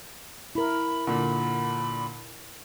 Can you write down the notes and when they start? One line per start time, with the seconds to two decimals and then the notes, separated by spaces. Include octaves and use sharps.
0.55 E4 A#4 B5
1.07 A#2 D3 B5